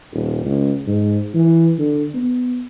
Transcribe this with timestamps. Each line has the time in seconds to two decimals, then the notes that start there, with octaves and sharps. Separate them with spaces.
0.13 D#1
0.44 C#2
0.87 G#2
1.35 E3
1.78 D3
2.14 B3